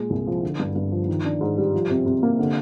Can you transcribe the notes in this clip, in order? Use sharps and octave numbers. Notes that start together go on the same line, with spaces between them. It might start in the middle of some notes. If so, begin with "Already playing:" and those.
Already playing: A#2 G#3
C2
F3
D3
G2
G2
F3
D#3
D4
G#2
G3
F3
C3
C3
A#3
D3